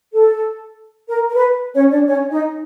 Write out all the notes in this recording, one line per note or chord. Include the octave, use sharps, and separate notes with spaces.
A4
A#4
A#4
B4
C#4 C#5
D4 D5
C#4 C#5
D#4 D#5